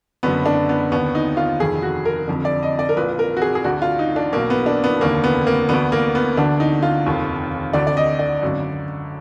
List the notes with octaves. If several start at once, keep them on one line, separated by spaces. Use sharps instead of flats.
F#1 F#2 D3 B3
D4
B3
D#2 D3 B3
D#4
F4
F1 F2 D#3 G#4
F#4
A#4
F1 F2 D3
D5
D#5
D5
A#4
A#1 A#2 B4
A#4
F#4
G#4
G#4
D2 D3 F#4
F4
D#4
D4
B1 B2 A#3
B3
D4
B3
F1 D#2 D3 A#3
B3
A#3
D2 D3 B3
A#3
B3
D2 D3 D4
D#4
F4
F1 D#2 D#3
D2 D3 D5
D5
D#5
D5
G#1 F#2 D3